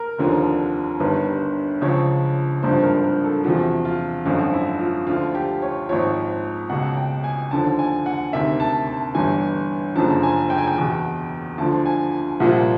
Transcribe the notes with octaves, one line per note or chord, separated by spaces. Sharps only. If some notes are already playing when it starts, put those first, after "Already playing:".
Already playing: A#4
F1 D#2 D3 F3
G1 G2 D#3 B4
C#2 C#3 F3 C#5
G#1 G2 D3 F3 C5
A#4
A#4
A4
E2 C3 F3 F#4
F4
G#1 F#2 D3 F3 F4
E4
F4
D2 D3 F3 F4
G4
C#5
G#1 G#2 F3 C#5
C#2 B2 F#5
G5
G#5
D#2 D3 F3 A5
G#5
F#5
D2 C3 D#3 E5
A5
A5
G1 G2 E3 G#5
F#1 F#2 D3 F3 A5
G#5
G5
G#5
G5
E2 B2
D2 D3 F3 A5
G#5
C2 A#2 F3 F#5